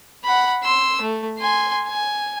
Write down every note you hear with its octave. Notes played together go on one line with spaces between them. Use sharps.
F#5 B5
C6 E6
A3
G#5 C6
G#5